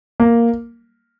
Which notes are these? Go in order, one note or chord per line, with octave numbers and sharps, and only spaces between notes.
A#3